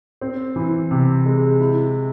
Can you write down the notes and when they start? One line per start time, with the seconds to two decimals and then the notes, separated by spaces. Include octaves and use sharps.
0.21 C4
0.56 E3
0.91 C3
1.26 G#3
1.60 E4